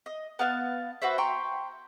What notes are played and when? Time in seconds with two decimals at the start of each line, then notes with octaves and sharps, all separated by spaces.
0.06 D#5
0.39 B3 F5 F#5 A5
1.02 F#4 B4 C5 E5
1.18 G5 A#5 C6 C#6